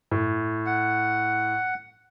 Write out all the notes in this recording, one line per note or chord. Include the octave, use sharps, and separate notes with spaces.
A2
F#5